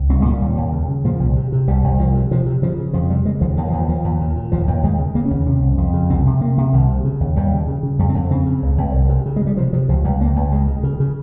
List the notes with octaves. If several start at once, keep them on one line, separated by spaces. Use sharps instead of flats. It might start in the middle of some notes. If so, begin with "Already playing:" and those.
Already playing: C#2
C2 C4
G#3
A#2 G3
D#2
D#2
C#3
C#3
A#2 F3
C2
C3
C3
C2 G3
C2
C2 F3
C3
C3 F3
C3
C#3 F3
C#3
F2 F3
C3 G3
C#3 G#3
D#2 F3
D#2 D#3
F3
D#2
F3
D#2 F3
D#2
A#2
A#2
D#2 F3
D#2
D#2 G#3
C#3
C#3 A#3
C#4
D#2
C3 C#4
C2
F2
C#3
C2 C4
C3
C3 A#3
C3
C2 D#3
C3
C#3
D#2
D#2 G3
C#3
C#3
C#3
F2 G3
C4
F2
C#3 C4
C#3
C#2
C#2
C2
C3
C#3
G#3
C#3
G3
C3 F3
C3 F3
C#2 F3
C#2 G3
C#2 A#3
C#2
C#3 G#3
C#3
C#3
C#3